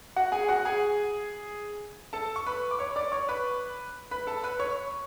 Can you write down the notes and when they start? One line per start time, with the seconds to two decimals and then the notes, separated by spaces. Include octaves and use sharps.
0.16 F#4 F#5
0.32 G#4 G#5
0.49 F#4 F#5
0.65 G#4 G#5
2.13 A4 A5
2.36 C#6
2.46 B4 B5
2.71 D6
2.79 C#5 C#6
2.96 D5 D6
3.12 C#5 C#6
3.29 B4 B5
4.11 B4 B5
4.27 A4 A5
4.44 B4 B5
4.60 C#5 C#6